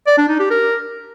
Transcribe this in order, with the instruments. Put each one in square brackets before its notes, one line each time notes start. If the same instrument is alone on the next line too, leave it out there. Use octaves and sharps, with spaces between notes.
[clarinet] D5
D4
D#4
G4
A#4